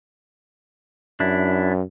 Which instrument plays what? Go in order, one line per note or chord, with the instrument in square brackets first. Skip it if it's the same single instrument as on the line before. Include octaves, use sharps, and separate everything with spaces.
[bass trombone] F#2 [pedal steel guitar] D4 E4